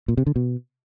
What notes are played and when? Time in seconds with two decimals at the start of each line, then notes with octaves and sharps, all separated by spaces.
0.08 A#2
0.17 C3
0.27 D3
0.36 B2